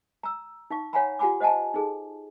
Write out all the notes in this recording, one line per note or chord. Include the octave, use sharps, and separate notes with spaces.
A#5 E6
D#4 F5 C#6
C#5 F5 F#5 G#5 A#5 B5
F4 G4 F#5 G#5 B5 D6
C5 D#5 F#5 G#5 A5
D#4 G#4 A4